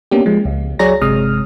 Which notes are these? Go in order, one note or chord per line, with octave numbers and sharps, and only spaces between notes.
A#3 B3 C#4 D4 G4
F3 G#3
C#2
F#3 G#4 C#5 D5 A#5 A#6
G1 C3 G#3 D#6 F6